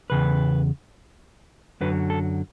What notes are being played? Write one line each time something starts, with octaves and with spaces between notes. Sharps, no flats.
E2 C#3 B4
F#2 D3 F#3 B4
A4